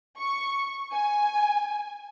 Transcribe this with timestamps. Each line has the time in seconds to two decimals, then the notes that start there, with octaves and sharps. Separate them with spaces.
0.18 C#6
0.93 G#5